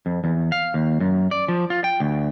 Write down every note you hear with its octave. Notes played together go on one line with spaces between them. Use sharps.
F2
E2
F5
D#2
F#2
D5
F3
F4
G5
D2